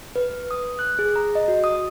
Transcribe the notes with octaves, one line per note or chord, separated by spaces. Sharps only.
B4
D#6
F#6
G#4
A#5
D#5
F#4
D#6